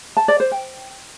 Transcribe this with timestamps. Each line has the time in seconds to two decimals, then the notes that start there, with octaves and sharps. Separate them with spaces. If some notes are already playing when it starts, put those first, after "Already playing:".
0.17 A5
0.28 D5
0.40 C5
0.51 G5